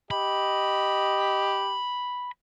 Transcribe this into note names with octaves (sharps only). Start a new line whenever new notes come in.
G4 D#5 B5